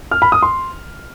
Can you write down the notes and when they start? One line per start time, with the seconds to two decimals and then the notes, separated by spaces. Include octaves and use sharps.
0.11 F6
0.22 B5
0.32 D#6
0.42 C6